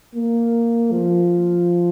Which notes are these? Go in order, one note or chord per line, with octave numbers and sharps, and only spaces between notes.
A#3
F3